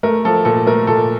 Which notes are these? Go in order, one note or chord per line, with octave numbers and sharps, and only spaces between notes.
A3 A#4
F3 A4
A#2 A4
A3 A#4
A#2 A4